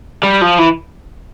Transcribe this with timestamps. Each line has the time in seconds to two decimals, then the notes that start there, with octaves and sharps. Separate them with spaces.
0.23 G3
0.42 F3
0.59 E3